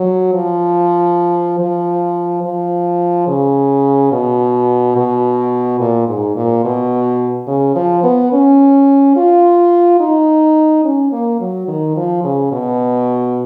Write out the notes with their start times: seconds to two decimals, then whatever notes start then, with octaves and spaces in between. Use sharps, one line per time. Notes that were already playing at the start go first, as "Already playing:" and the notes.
Already playing: F#3
0.34 F3
1.59 F3
2.44 F3
3.27 C#3
4.12 B2
4.96 B2
5.80 A#2
6.08 G#2
6.36 A#2
6.64 B2
7.47 C#3
7.75 F3
8.03 B3
8.32 C#4
9.16 F4
10.00 D#4
10.85 C#4
11.12 A#3
11.40 F#3
11.68 D#3
11.97 F3
12.24 C#3
12.52 B2